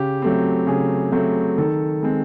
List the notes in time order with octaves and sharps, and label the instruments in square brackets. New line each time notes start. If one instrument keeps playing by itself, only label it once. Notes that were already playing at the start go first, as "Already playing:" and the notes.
Already playing: [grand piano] C#3 G4
F#3 A3 C4
C#3 G#4
F#3 A3 C4
D#3 A4
G#3 C4